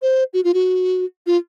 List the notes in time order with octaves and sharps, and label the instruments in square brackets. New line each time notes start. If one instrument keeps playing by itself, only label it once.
[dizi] C5
F#4
F4
F#4
F4